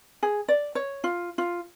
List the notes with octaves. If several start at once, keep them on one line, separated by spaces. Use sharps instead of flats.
G#4
D5
C#5
F4
F4